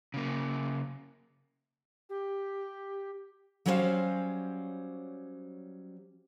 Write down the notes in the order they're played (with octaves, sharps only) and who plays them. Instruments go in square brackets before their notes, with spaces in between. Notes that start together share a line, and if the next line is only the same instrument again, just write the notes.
[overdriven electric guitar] C#3 A#3
[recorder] G4
[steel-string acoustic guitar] F#3 G3 C#4 C5 C#5 F5